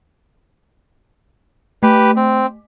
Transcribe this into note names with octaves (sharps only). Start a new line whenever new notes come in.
A3 G4 B4
C4